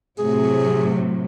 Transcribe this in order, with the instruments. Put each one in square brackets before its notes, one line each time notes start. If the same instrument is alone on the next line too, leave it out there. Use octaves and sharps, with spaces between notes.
[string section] A2 C3 F#3 [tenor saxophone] G#4